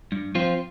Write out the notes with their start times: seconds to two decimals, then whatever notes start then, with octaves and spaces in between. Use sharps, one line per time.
0.12 G2
0.35 F3 C4 F4